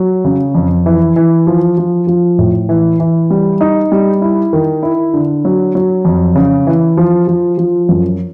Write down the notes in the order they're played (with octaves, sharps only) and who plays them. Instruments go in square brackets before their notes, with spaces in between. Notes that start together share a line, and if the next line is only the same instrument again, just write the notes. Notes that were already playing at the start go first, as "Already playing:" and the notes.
Already playing: [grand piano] F#3
C#3
F2
E3
E3
F3
F3
F3
A2
E3
E3
G3
D#4
G3
E4
D#3
E4
D3
F#3
F#3
F2
C#3
E3
F3
F3
F3
F#2